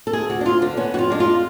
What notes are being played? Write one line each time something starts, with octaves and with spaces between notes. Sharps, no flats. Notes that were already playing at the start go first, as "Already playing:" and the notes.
A4
D2 G#4
D2 F#4
D4
D2 F4
D3 D4
B3 C#4
F2 F4 F#4
G#3 D4
G#3 F4